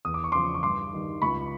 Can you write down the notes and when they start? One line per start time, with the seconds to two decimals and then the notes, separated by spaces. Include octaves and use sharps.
0.05 E2 D#6
0.14 D6
0.24 C#6
0.32 C#3 F3 C6 D6
0.54 C#6
0.63 G2 C6 D6
0.93 D#3 G3
1.22 C#2 B5 C#6